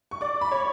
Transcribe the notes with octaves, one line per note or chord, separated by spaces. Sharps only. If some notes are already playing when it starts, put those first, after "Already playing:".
C#6
D5 D6
B5
C#5 C#6